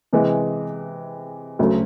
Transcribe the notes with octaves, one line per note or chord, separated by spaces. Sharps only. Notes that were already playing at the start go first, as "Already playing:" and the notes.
C3 E3 G#3
D2 C#3 F#3 A3